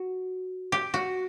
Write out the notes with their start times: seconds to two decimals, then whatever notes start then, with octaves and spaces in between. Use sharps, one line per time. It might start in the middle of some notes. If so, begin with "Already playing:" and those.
Already playing: F#4
0.72 G4
0.94 F#4